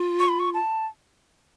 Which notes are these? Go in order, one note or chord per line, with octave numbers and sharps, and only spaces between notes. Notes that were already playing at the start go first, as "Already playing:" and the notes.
Already playing: F4
C#6
B5
C#6
A5